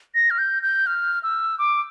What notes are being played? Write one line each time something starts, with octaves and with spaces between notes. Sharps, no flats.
A#6
F6
G6
G6
F6
E6
D6